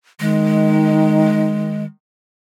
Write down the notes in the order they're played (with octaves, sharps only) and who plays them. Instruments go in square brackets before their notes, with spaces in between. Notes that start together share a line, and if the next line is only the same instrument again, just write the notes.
[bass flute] D#3 [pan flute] G#3